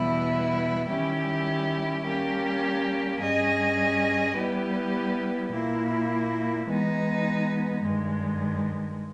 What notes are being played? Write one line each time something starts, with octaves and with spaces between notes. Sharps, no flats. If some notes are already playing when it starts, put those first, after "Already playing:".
Already playing: E2 B2 G3 B3 E4
D#3 G3 C#4 E4 G4
G3 A#3 C#4 G4
G2 G3 C#4 G#4 D#5
G3 B3 E4 G4 B4
A#2 A#3 E4
E3 G#3 B3 D#4
G2 D#3 G#3